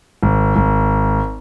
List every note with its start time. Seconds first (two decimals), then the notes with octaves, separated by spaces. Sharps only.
0.23 G#1
0.56 G#1